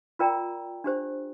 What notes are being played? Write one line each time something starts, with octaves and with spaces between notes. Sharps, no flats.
F4 A#4 D5 G5 A#5
D4 G4 C5